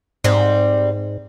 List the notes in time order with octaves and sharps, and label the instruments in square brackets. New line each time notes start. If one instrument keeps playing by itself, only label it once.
[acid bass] G#2 [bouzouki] G3 C4